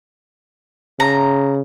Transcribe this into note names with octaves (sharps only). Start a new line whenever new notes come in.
C#3 A#5